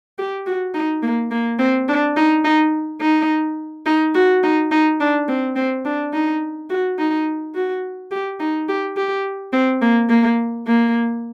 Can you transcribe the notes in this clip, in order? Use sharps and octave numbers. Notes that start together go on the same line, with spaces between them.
G4
F#4
D#4
A#3
A#3
C4
D4
D#4
D#4
D#4
D#4
F#4
D#4
D#4
D4
C4
C4
D4
D#4
F#4
D#4
F#4
G4
D#4
G4
G4
C4
A#3
A#3
A#3